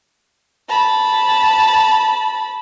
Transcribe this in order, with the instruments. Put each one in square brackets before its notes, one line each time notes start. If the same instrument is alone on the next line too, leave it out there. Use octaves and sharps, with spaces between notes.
[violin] A5 B5